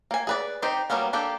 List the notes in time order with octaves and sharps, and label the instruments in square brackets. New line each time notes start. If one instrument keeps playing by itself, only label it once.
[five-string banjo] A#3 G#5
G#4 B4 D5
C4 D#4 G4 C5
F#3 G3 A#3 B3 C#4
A#3 D4 G4 A4